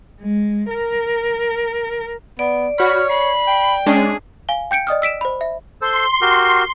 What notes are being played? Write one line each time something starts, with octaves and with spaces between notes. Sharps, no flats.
G#3
A#4
B3 D5
F#4 C#5 B5 F6
B5 C7
G5
G#3 C#4 D4 G#4
F5 G#5 G7
G5 G6 C#7 D7
D5 D#5 D#6 F6
E6 B6 D7 E7
C5 B5
E5
A4 C5 C6
F#4 G4 A#4